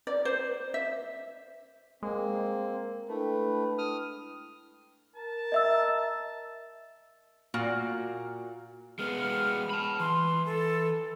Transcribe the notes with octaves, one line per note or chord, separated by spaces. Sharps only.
D5
C5
E5
G#3 A#3 C4 A#4
A3 D4 E4 B4 G5
D#6 F6
A#4 A5
D#5 E5 E6
A#2 A#3 F#4 F5
G#3 B3 F6
A5 B5
E3 C6
A4